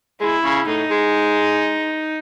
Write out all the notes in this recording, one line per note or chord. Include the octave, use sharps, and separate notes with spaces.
G#3 E4
C#3
A2 D#4
G#3